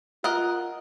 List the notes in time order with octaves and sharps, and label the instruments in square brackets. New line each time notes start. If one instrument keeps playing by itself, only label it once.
[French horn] F4 [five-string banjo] A#4 D#5 F#5